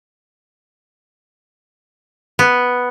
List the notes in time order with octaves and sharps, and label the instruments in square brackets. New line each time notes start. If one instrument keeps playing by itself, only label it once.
[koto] B3